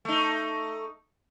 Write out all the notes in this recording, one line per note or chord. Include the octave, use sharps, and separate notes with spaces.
A3 D#4